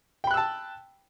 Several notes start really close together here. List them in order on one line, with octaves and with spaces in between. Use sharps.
G5 B5 F#6 E6 A5